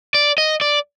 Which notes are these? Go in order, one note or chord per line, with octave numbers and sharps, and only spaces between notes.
D5
D#5
D5